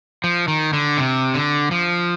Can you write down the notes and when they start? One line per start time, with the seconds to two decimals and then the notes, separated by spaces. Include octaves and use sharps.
0.24 F3
0.48 D#3
0.73 D3
0.97 C3
1.34 D3
1.71 F3